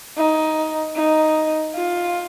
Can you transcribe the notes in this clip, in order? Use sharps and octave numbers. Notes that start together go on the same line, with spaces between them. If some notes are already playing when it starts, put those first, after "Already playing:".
D#4
D#4
F4